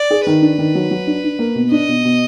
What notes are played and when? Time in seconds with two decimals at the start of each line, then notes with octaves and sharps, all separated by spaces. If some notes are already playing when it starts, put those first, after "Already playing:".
Already playing: D5
0.11 G#4
0.26 D#3 B4
0.42 D4
0.58 D#3
0.75 F#3
0.91 F#3
1.07 D4
1.24 D4
1.39 A#3
1.55 B2
1.71 D4 D#5
1.88 B2
2.05 B2